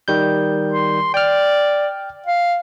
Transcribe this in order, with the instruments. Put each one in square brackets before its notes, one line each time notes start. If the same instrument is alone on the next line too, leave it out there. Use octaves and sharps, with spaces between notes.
[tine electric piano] D#3 G3 G6
[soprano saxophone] C6
[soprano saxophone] D5 [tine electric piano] G5 F6
[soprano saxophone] F5